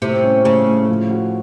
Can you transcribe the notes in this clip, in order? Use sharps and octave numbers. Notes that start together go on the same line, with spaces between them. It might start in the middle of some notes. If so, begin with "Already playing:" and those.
A2 C3
C#4
C#3 A3
A2
F3
F#4